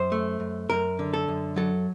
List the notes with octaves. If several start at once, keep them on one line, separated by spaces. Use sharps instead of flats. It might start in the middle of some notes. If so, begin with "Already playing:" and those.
Already playing: F#2 C5
A3
F#2
F#2 A#4
D3
A4
F#2
F#3 A4